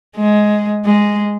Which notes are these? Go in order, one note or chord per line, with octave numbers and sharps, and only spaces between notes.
G#3
G#3